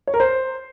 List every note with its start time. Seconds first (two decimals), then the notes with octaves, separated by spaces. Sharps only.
0.07 C#5
0.14 A#4
0.20 C5